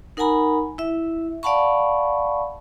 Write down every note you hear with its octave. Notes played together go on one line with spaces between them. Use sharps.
D#4 A#4 F#5 G#5 A#5 B5
E4 E5
D5 F5 F#5 A5 B5 C#6